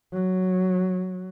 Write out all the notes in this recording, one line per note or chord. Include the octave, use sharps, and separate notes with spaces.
F#3